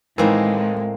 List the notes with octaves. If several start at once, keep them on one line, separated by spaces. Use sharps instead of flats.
A2 D#3 E3 G#3 A#3 C4